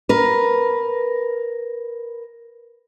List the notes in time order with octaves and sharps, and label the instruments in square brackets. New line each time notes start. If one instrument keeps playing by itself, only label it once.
[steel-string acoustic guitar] A#4 B4